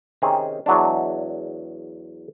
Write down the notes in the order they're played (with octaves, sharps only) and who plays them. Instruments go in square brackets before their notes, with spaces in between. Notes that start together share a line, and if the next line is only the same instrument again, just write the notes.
[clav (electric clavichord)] C3 D#3 C4 C#4 G#4
E2 F#3 G#3 D4